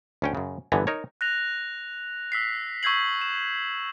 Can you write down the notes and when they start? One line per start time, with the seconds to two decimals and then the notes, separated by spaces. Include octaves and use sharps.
0.22 D2 C#4 G5
0.35 F#2 C#3
0.72 G1 D3 E3 B3 G#5 A#5
0.87 D#4 A#4 C#5
1.21 F#6 A#6 F7
2.32 E6 B6 C7
2.83 C#6 E6 G6 G#6 C7 F#7
3.21 E7